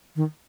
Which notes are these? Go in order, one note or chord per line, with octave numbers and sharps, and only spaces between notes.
D#3